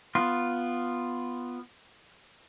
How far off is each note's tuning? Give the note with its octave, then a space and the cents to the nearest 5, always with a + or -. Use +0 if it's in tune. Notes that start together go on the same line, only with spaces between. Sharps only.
B3 +0 F4 +0